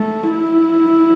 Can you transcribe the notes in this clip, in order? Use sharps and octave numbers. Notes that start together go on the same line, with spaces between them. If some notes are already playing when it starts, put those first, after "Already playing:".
Already playing: A3
E4